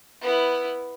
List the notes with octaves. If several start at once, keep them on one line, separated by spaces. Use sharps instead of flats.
B3 E4